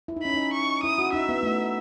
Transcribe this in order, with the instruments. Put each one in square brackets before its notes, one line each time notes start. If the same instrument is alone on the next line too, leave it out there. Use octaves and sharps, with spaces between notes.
[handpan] E4
D#4
[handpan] C#4 [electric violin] B5
[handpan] D#4
[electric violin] C#6
[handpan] E4 [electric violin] D#6
[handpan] F#4
[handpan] D#4 [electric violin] E5
[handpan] B3
A3